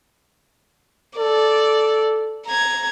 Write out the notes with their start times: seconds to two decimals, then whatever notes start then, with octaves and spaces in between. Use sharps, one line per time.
1.19 A4 D5
2.46 A#5 G#6